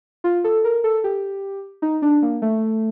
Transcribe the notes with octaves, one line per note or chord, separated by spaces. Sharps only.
F4
A4
A#4
A4
G4
D#4
D4
A#3
A3